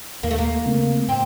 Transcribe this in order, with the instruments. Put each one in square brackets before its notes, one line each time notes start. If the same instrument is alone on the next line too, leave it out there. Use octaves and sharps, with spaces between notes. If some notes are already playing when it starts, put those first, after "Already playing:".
[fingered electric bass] D#2 [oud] A#3
[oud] A3
A#3
[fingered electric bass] C#3 A3 C4
[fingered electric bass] A2 [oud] C4